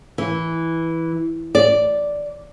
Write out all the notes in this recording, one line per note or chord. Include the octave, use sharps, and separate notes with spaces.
E3
D5